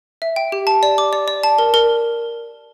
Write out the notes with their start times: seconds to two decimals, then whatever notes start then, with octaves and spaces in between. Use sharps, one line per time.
0.22 E5
0.36 G5
0.52 G4
0.67 A5
0.83 D5
0.98 D6
1.13 D5
1.28 D5
1.43 A5
1.59 A#4
1.74 A#4